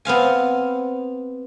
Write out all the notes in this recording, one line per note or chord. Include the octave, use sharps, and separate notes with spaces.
B3 C4 F5 G#5